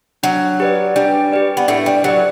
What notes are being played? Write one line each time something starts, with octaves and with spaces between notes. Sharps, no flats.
F#3 D4
G4 B4 D5
G3 D4
G4 B4 D5
B3
A2 A3 D4
G3
F#3 G4 B4 D5